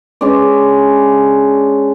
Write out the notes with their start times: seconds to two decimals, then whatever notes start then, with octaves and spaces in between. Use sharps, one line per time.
0.21 G#3 C#4 D4 D5